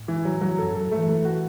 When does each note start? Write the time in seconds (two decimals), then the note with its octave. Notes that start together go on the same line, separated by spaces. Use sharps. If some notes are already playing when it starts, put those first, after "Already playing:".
Already playing: A2
0.08 E3
0.25 F#3
0.42 F#3
0.58 F#2 A4
0.75 A4
0.91 E3 A3
1.09 A3
1.25 F#4